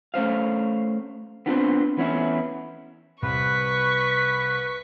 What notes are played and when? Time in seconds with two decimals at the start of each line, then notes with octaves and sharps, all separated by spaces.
0.14 A3 C#4 C5 F5
1.46 B3 C4 D4 F4 B4 C5
1.97 E3 B3 C#4 E4
3.22 C2 B4 C#6 B6